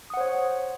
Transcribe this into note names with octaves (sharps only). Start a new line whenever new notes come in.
C5 C#5 F#5 D#6